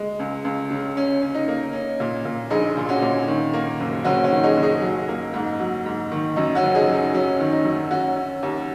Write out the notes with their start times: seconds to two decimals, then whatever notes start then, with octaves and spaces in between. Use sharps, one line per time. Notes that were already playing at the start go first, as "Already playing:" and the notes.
Already playing: G#3
0.19 C#2
0.45 C#2
0.70 C#3
0.97 C#4
1.22 C#4
1.35 D#4
1.48 A#3
1.73 C#4
2.00 A#2
2.25 A#2
2.50 A#1 D#4 G#4
2.77 A#2
2.89 C#4 F#4
3.02 A#2
3.28 D#3
3.53 A#3
3.80 F#1
4.04 F#1 C#4 F#4
4.24 C#4 F#4
4.31 D#3
4.43 D#4 G#4
4.57 F#1
4.63 D#4 G#4
4.82 F#3
5.08 A#3
5.34 G#2
5.60 F#3
5.86 G#2
6.11 D#3
6.36 F#2 D#4
6.55 C#4 F#4
6.63 F#1
6.75 D#4 G#4
6.88 F#3
6.94 D#4
7.14 F#3 C#4
7.40 D#3
7.52 D#4
7.65 F#2
7.91 C#4 F#4
8.16 C#4
8.43 D#2